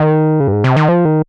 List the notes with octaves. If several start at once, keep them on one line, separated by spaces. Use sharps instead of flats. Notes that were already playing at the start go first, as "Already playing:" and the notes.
Already playing: D#3
C#3
G2
G#2
C3
D#3
F3
D#3